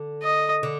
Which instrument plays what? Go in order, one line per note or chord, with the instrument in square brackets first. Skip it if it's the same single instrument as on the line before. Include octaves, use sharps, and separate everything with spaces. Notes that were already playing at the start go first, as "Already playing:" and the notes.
Already playing: [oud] D3
[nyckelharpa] D#5
[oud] D3